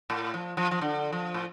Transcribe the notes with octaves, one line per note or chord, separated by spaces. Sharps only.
A2
F3
F3
F3
D3
F3
A2